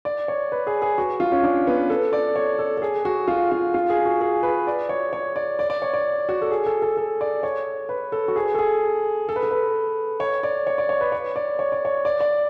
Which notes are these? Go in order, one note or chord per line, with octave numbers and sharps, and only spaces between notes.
D5
C#5
B4
G#4
G#4
F#4
F4
C#4
D4
B3
A4
D5
C#5
A4
A4
G#4
F#4
F4
F4
F4
G#4
F#4
G#4
B4
D5
C#5
C#5
D5
D5
D5
C#5
D5
F#4
A4
G#4
A4
A4
A4
D5
C#5
B4
A4
F#4
G#4
A4
G#4
A4
B4
A4
B4
C#5
D5
C#5
D5
C#5
B4
C#5
D5
C#5
D5
C#5
D5
D5